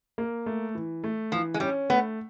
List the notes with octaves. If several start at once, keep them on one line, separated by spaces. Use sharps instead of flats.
A#3
A3
E3
A3
E3 F3
G#3
G3 C#4
A3 B3